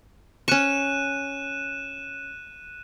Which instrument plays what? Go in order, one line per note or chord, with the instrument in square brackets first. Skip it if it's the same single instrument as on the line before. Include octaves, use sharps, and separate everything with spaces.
[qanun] C#4 C#6 [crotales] F#6 D#7 E7